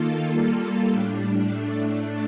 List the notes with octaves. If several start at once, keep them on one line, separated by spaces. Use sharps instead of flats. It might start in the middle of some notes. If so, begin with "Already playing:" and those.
Already playing: D#3 A#3 F4 A4
G3 A#3 F4 A4
A2 G3 D4
A2 A3 D4